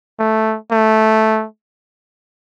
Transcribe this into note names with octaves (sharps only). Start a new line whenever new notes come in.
A3
A3